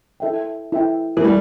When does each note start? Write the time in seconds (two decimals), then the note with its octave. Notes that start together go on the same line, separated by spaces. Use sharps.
0.20 E4 A4 E5 G5
0.72 E4 A4 E5 G5
1.17 E3
1.24 G3 A3 G4 D5